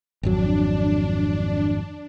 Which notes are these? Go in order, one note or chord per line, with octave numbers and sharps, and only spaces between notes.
G#1 F2 F#3 D4